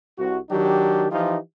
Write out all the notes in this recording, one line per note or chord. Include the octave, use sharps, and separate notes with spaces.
C2 F#4
D#3 F#3 D4 G4
E3 F3 D#4 F4 G4